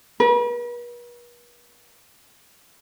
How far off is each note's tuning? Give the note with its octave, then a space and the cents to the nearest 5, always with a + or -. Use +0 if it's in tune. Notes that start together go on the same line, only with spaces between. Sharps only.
B4 -45